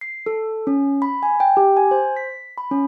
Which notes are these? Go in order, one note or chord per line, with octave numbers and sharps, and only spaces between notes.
C7
A4
C#4
B5
G#5
G5
G4
G#5
C5
B6
B5
C#4